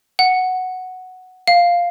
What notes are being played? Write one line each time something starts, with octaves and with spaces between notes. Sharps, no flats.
F#5
F5